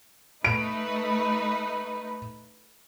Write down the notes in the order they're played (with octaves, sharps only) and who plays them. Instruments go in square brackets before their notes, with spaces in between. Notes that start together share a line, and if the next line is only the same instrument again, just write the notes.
[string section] A3 D#4 B4 [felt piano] D7